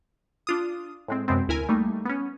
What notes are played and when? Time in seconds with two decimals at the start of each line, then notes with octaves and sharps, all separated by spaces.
0.47 D4 F4 D#6
1.08 A2 G#3 C4
1.28 F#2 C3 G#3 B3 C4
1.48 D2 E4 A#4 G#5
1.69 G3 A3 A#3 D#4
2.05 B3 C#4